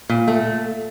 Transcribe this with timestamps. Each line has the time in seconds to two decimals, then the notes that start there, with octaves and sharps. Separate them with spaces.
0.09 A#2
0.28 A3